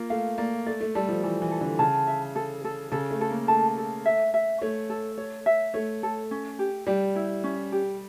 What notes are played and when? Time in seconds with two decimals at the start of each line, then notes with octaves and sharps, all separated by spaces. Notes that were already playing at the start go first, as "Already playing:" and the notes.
Already playing: A#3 F4
0.10 A3 F5
0.38 A#3 D5
0.67 A3 D5
0.81 A3
0.95 G3 A4
1.09 F3
1.23 E3 A4
1.42 E3
1.51 A4
1.61 D3
1.79 C#3 A5
2.07 E5
2.36 A4
2.65 A4
2.92 C#3 A4
3.11 A3
3.21 A4
3.30 A#3
3.48 A3 A5
3.77 A4
4.06 E5
4.34 E5
4.62 A3 C#5
4.90 A4
5.18 C#5
5.46 E5
5.74 A3 C#5
6.03 A4
6.31 C#4
6.59 G4
6.87 G3 G4
7.16 E4
7.44 C#4
7.72 G4